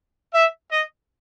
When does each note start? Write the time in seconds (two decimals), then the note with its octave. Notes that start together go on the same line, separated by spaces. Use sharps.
0.34 E5
0.70 D#5